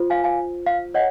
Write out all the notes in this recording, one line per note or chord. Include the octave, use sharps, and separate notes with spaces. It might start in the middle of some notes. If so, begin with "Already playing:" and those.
Already playing: F4 C5
F5 G#5
F5 G#5
F5
C#5 D#5 F#5